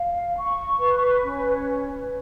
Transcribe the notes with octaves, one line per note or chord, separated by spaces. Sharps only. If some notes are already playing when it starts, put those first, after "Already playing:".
Already playing: F5
C#6
B4
C#4
B4